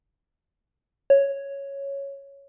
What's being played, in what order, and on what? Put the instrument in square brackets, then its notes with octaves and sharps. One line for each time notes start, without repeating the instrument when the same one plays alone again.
[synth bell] C#5